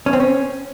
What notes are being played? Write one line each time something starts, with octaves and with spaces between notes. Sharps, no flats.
C#4
C4
C#4